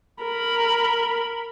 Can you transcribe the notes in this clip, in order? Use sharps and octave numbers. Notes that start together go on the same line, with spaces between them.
A#4 B5